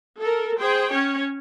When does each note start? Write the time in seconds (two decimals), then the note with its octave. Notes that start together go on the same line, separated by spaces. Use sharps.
0.19 A4 A#4
0.60 G#4 C5 G5
0.92 C#4 C#5